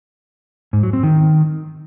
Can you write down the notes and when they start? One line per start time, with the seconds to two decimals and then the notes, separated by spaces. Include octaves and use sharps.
0.73 G#2
0.83 F#3
0.93 C4
1.03 D#3